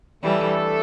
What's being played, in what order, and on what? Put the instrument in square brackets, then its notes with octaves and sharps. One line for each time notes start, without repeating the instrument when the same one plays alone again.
[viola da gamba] E3 G3 [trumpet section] A3 D4 A4 E5